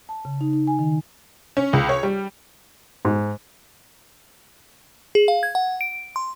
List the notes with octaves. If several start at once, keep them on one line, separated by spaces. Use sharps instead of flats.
A5
C#3
D#4
D#4
G#5
D#3
C#4
C#2
C#5
G3
G#2
G#4
F5
G#6
F#5
D7
C6